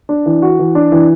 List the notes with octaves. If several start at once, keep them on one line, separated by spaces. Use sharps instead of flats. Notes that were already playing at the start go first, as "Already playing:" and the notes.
D4
E3
F#4
E3
D4
E3